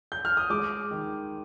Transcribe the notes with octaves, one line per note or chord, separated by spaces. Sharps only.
G6
F6
D#6
G#3 D6
D#3